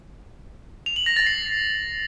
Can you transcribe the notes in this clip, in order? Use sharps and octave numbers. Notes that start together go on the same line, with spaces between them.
F7
F#7
A#6
A6
C7